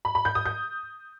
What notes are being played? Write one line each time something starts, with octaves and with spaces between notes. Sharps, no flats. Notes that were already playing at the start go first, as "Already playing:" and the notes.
B5
B5
G6
D#6
G6